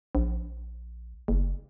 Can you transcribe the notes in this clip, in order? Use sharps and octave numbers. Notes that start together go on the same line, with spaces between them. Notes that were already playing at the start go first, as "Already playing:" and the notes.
A#1
F#1